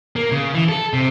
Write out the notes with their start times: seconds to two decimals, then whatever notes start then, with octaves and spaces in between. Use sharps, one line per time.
0.16 A#3
0.32 C#3
0.54 E3
0.69 A4
0.93 C3